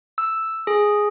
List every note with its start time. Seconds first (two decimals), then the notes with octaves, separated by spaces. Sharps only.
0.18 E6
0.67 G#4